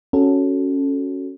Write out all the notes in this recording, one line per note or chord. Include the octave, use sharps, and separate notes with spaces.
C#4 F#4 A4